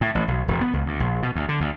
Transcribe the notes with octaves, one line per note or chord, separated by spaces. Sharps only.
A2
A1
B1
E1
B3
C#2
D2
A#1
B2
D2
D3
D2